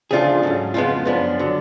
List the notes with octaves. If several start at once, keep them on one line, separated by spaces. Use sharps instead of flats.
D2 C#3 F3 A3 D4 F4 G#4
G#2 F#3 C#4
F2 C#3 G#3 B3 F4
F#2 F3 B3 D4
D3 F#3